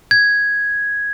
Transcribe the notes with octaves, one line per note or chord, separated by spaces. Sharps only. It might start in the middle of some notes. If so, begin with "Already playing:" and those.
G#6